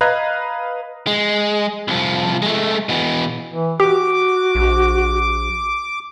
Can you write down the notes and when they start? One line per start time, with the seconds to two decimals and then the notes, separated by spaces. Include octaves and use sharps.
0.01 B4 D#5 F5 A#5 F#6 G#6
1.07 G#3
1.88 C2 F3
2.42 G#3 A3
2.89 B2 E3
3.52 E3
3.80 F#4 G4 D6
4.55 A#1